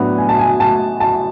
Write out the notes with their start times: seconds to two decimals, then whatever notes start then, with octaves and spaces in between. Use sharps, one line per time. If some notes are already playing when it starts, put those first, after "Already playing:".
Already playing: A2 F#3 B3 D4
0.18 G#5
0.29 A5
0.39 G#5
0.60 A5
1.00 A5